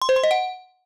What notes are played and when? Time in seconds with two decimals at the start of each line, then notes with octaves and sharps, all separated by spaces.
0.02 C6
0.09 C5
0.16 C6
0.23 D#5
0.31 F#5